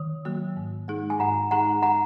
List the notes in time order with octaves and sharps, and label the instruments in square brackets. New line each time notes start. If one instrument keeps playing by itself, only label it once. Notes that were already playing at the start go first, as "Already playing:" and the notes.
Already playing: [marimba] D#3
F#3 A#3 F#4
G#2
G#3 D#4 G#4
[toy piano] G#5
[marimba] G#2 [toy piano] F#5 A#5
[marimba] G#3 D#4 G#4 [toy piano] F#5 A#5
[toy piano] F#5 A#5